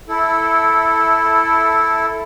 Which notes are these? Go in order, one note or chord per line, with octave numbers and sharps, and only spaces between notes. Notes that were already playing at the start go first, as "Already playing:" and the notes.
E4 A4